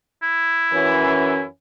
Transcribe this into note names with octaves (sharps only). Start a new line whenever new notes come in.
E4
F#2 E3 C#4